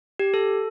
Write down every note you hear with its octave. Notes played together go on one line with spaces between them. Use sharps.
G4
A4